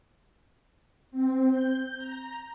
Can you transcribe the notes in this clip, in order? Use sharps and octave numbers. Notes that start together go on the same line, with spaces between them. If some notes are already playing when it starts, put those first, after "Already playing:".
C4
G6
A#5